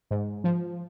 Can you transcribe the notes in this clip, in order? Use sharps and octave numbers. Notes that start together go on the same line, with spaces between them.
G#2
F3